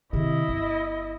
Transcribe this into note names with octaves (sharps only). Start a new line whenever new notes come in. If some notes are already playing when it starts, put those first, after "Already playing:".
C3 D#3 E4 D#5
G1